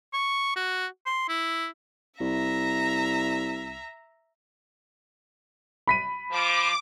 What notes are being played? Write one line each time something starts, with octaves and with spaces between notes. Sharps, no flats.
C#6
F#4
C6
E4
C2 E5 A#5
B5 B6 D#7
F3 D6